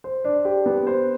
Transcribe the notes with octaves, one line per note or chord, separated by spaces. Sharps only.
C5
D4
G4
B3
C5